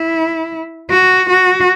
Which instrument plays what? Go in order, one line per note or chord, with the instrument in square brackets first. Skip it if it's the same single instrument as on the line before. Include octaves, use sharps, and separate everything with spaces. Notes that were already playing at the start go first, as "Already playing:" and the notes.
Already playing: [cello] E4
F#4
F#4